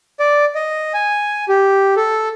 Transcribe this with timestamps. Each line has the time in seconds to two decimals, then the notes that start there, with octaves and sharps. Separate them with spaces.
0.20 D5
0.55 D#5
0.94 G#5
1.48 G4
1.96 A4